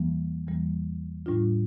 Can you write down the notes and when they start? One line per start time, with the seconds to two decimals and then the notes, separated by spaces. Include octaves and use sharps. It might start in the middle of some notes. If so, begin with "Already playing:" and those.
Already playing: E2 E3 G3 A#3
0.47 E2 E3 G3 A#3
1.26 A2 G3 D4 F4